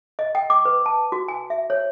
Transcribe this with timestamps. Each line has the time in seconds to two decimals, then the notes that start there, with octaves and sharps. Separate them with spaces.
0.19 D#5
0.35 G5
0.50 D6
0.65 B4
0.86 A5
1.12 F#4
1.28 G#5
1.50 E5
1.70 C#5